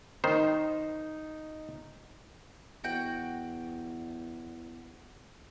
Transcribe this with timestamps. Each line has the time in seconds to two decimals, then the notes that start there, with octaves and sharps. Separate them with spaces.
0.24 D#3 D#4 C5
2.84 E2 F#4 G5